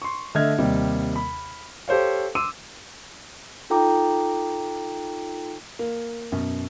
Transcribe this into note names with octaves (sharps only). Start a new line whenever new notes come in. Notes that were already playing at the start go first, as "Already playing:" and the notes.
C6 C#6
D3 A3 D#5 E5 F6 G#6
D#2 C3 G3 D#5
B5
G4 A4 C5 C#5 F5
C6 D6 E6 D#7
D#4 F4 A4 G5 A#5 D6
A#3
F#2 B2